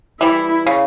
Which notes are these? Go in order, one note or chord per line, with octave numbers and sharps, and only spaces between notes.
E3 G3 E4
C#3